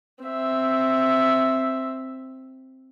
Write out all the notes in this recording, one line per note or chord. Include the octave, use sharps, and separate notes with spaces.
C4 E5